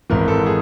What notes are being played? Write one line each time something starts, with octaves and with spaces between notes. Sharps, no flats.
G#1 G#2 E3 A#4
A4
G#4